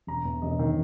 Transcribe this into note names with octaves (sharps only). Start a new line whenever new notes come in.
E1 A#5
E2
E1 D#5
D#3